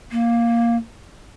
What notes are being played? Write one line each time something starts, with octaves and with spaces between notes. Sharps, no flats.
A#3